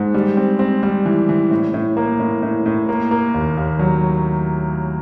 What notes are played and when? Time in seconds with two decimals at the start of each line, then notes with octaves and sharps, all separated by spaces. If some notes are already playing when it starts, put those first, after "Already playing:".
Already playing: G#2
0.14 G3
0.37 C4
0.59 C4
0.83 G3
1.05 E3
1.29 E3
1.51 A2
1.74 A2
1.97 A#3
2.20 A2
2.43 A2
2.66 A2
2.89 A#3
3.11 A#3
3.34 D#2
3.57 D#2
3.79 F#3